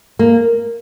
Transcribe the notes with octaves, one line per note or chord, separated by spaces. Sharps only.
A#3